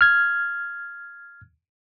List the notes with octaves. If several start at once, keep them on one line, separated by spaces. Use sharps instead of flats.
F6 G#6